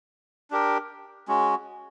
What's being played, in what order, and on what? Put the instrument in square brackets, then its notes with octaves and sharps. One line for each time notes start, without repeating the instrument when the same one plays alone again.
[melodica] D4 G4 A#4
G#3 C#4 F#4